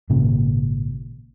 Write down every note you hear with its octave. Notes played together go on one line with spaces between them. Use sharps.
G#1 A#2 C#3